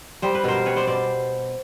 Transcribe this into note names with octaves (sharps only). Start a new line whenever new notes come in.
G3 C5
B4
B2 A#4 C5
G3 B4 C#5
C5 D5
B2 C5 D5